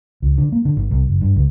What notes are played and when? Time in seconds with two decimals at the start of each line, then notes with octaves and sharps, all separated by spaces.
0.22 C#2
0.38 D3
0.52 A#3
0.65 D3
0.77 G#1
0.91 C2
1.08 F#1
1.21 G2
1.36 C#2